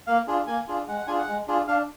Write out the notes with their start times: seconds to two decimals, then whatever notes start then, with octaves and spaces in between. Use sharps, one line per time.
0.07 A#3 F5
0.27 D4 F4 G#4
0.47 A#3 G#5
0.68 D4 F4 G#4
0.87 G#3 F#5
0.98 F#5
1.07 D4 F4 G#4 G#5
1.18 F#5
1.28 G#3
1.48 D4 F4 G#4
1.67 D4 F5